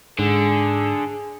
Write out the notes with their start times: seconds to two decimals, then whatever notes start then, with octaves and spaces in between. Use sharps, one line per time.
0.19 G#2 D3 G#4